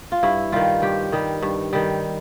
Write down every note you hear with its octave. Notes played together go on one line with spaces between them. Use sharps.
F4
G2 E4
D#3 G3 F4
G2 G4
D#3 G3
G2
D#3 G3